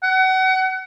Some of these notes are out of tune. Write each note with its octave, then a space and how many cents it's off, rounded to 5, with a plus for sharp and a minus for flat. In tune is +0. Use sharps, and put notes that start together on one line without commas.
F#5 +30